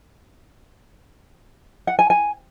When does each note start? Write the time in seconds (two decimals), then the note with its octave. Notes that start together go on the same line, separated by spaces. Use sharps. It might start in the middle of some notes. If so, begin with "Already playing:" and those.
1.87 F#5
1.99 G#5
2.10 G#5